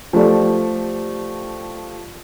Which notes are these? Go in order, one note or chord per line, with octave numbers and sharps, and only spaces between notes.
F3 A3 G4 D5